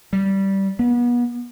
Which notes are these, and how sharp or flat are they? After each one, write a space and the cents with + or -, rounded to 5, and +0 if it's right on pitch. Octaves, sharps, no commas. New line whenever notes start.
G3 -10
B3 -35